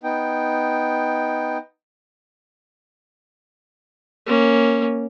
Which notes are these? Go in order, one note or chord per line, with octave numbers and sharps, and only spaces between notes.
B3 D#4 G5
A#3 C#4